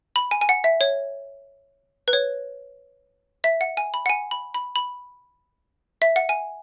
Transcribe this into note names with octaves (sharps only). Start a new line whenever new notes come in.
B5
G#5
G#5
F#5
E5
C#5
B4
C#5
E5
F#5
G#5
B5
F#5
G#5
B5
B5
B5
E5
F#5
G#5